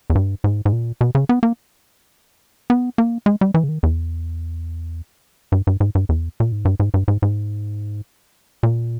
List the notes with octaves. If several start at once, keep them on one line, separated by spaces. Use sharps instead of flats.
E2
G2
G#2
G#2
A#2
B2
C#3
B3
A#3
B3
A#3
G#3
G3
E3
C#3
D#3
E2
G2
G2
G#2
G2
E2
A#2
G#2
G2
G#2
G2
G#2
G#2
A#2